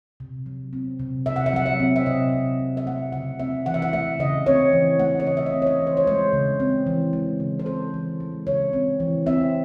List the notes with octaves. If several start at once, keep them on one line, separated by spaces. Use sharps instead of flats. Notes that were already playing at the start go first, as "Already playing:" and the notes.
C3
F#3
C4
C3
C3 E5
F#5
E5
F#3 F#5
E5
C4
E5
C3 D#5
C3
F#3
E5
A3 F#5
C#3 F#5
C4 E5
E3 F#5
E5
F#5
A3 E5
C#3 D#5
C4 C#5
E3
A3 F#5
C#5
C#3 D#5
E5
D#5
C4
C#5
D#5
E3
C5
C#5
G#3 C5
C#3
C4
E3
G#3
C#3
C5
C4 A4
E3
G#3
C#3 C#5
C4
E3
C4 E5